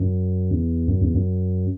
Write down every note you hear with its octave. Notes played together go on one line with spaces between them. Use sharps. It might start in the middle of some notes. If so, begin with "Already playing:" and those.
Already playing: F#2
E2
F#2
E2
F#2